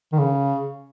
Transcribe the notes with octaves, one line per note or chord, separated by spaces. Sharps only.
D#3
C#3